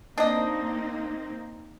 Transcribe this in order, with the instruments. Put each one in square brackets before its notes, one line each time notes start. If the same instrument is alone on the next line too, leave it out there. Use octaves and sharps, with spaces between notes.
[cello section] A#3 C4 D#4 [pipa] D4 D#5